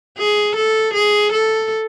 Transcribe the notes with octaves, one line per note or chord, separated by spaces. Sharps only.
G#4
A4
G#4
A4